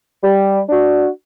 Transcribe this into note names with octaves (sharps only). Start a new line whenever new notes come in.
G3
D4 F#4